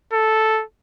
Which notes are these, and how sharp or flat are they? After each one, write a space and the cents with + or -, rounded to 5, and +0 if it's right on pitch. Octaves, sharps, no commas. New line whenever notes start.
A4 -5